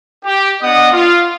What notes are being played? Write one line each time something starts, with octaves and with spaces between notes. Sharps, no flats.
G4
B3 D4 D#5 F#5 D#6
F4